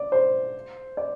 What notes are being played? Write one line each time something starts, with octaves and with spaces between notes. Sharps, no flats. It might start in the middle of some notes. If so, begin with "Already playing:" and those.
Already playing: D5
C5
D5